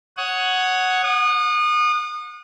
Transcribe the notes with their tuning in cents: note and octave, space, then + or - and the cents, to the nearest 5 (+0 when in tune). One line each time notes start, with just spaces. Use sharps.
C#5 +0 F#5 +0 D#6 +15
F#5 -35 D#6 -30